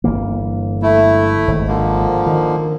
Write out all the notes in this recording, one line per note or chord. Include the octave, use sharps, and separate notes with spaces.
G1 E3 A#3
A3 E4
G#1
D3 F3 A#3
D#3